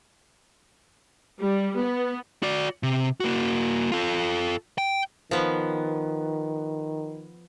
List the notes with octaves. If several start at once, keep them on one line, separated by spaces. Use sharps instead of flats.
G3
B3
F#4 D5
C3
A#3 F#4
F4 A4
G5
D#3 F3 B3